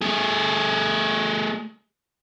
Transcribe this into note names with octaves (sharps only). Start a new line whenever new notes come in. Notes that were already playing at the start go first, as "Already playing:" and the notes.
A3 G#4